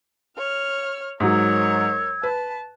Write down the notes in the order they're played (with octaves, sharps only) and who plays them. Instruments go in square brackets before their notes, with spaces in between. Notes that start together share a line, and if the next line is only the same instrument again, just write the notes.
[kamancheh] C#5 F6
[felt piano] G#2 F#3 [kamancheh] A#4 C#5 [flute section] E6 G#6
[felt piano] B4 [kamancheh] A5